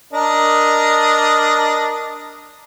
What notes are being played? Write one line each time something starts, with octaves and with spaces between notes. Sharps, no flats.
D4 A#4 D#5